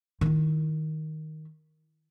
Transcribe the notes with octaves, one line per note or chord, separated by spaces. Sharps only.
D#3 E4